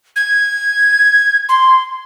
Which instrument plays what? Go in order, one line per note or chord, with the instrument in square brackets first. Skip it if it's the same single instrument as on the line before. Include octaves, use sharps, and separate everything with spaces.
[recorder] G#6
C6